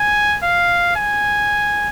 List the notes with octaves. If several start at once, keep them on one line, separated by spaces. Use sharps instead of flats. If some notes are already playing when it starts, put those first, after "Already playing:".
Already playing: G#5
F5
G#5